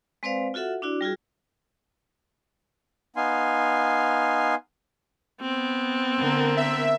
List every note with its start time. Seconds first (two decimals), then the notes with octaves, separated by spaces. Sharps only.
0.23 G#3 C4 B4 C5 D5 F5
0.54 F4 F#4 A4 E5 F#5
0.82 D4 E4 F#4 D5
1.01 G3 F4 F#4 G#4
3.16 B3 D#4 F5 G#5 C6
5.41 B3 C4
6.17 D3 A#3 A#4
6.57 E5